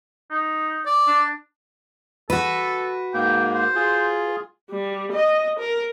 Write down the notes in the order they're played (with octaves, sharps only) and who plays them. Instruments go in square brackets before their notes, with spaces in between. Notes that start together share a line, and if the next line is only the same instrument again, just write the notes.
[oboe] D#4
[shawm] D5
[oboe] D4
[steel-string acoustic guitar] F#4 B4 [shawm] A4
[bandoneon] G#2 A#3 [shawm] G5
[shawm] C5
[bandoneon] F4 G#4
[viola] G3
D#5
A#4